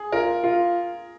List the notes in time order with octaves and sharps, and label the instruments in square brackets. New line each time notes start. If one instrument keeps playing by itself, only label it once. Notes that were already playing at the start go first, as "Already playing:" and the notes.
Already playing: [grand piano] G#4
[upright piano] F4 [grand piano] A#4
[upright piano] F4